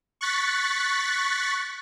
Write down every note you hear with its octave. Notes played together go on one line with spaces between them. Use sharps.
C#6 F#6 A6 B6